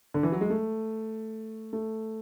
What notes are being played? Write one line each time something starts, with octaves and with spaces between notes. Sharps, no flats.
D3
E3
F#3
G#3
A3
A3